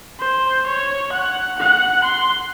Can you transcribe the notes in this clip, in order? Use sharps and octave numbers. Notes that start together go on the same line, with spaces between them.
C5
C#5
F#5
F#5
C6